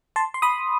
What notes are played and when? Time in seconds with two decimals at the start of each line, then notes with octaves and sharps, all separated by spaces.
0.16 A5 C6
0.34 C6
0.42 B5 D#6